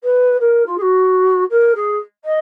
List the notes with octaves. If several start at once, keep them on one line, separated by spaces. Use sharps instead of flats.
B4
A#4
F4
G#4
F#4
A#4
G#4
D#5